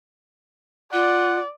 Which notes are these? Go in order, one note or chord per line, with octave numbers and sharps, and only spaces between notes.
F4 D5 F#5